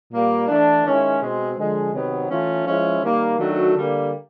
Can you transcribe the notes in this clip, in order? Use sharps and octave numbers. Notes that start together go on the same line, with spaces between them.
A#2 G3 A#3
E3 A3 D4
D#3 G#3 C#4 E4
B2 G#3 C4
D3 F3 G#3
C3 D#3 F#3 B3
E3 A3 C#4 F4
F3 G#3 C#4 E4
D#3 G3 A#3
D#3 F#3 A3 D4 F#4
D3 G3 A#3